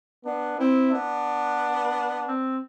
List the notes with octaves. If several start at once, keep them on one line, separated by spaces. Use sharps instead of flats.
B3 D4
C4 E4
B3 D4
C4